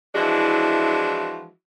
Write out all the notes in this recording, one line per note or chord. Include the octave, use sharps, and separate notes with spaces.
E3 F3 G#3 D4 E4 F#4